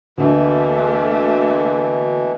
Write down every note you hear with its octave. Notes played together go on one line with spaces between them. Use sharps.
D2 B2 E3 A3 A#3